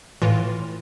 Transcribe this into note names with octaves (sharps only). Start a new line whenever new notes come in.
A2 E3 F4